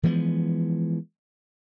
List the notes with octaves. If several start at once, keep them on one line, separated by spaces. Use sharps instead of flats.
E3 F3 G#3 B3